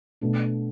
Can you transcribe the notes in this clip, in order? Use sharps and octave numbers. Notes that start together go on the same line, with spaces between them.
B2 A3 D4